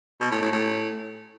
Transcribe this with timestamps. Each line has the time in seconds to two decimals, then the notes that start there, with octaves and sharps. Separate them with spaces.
0.21 B2
0.31 A2
0.42 A2
0.52 A2